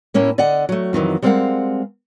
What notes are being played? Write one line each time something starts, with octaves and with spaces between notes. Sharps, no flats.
A2 A#3 C#4 E4
D3 D5 D#5 F#5
F#3 A3
F2 D#3 E3 F#3
G3 G#3 C4 A#4 F5 F#5